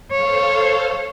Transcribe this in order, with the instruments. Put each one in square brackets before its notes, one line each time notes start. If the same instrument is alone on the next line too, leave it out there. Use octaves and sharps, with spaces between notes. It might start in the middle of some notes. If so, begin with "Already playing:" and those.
[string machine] A4 C5 F5 [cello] C#5